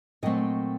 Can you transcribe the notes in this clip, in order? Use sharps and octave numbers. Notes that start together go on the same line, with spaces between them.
A#2 F#3 A3 C4 D#5 G5